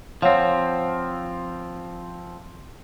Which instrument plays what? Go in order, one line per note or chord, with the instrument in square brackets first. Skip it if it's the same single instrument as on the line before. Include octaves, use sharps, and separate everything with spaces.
[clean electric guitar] F3 C4 [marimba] C#5 F5 F#5